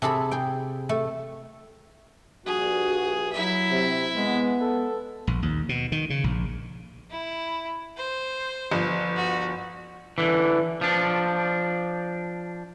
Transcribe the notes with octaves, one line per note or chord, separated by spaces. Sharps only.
C3 G#4 A4 A5 B5
G#4 G5
A3 A4
A#1 G2 F#4 G#4
F#3 E4 E5
C3
G#3 B3
A4
A#1
D#2
B2
D#3
C#3
A#1
E4
C5
G1 F3
F#4
D3 E3
F3 D4